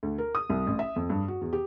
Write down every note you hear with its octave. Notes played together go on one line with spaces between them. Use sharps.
D2
A#4
D#6
C2
A1
E5
F2
G2
F#4
E2
G4